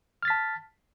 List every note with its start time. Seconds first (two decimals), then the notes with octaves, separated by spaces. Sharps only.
0.23 F6
0.25 A6
0.28 B6
0.30 A5